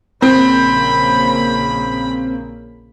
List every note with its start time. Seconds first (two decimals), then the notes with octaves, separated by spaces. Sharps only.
0.22 A#1 C#3 A#3 C4 B5